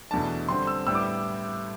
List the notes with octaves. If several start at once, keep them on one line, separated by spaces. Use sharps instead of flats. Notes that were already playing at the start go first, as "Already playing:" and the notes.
E2 B2 A3 D4 A5
D3 G3 C4 C6
E6
A2 G3 B3 D4 E6
D6